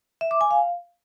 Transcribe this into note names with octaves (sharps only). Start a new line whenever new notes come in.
E5
D6
G#5
F5